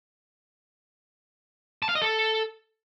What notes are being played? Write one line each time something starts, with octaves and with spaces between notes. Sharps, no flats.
A5
F5
D#5
A4